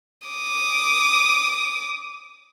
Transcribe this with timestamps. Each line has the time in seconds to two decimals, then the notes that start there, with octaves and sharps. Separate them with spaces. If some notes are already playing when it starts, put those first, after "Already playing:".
0.27 D6 D#6